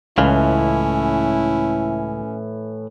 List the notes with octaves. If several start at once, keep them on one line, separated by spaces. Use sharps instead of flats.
C#2 A2 E3 C#4 E4 F5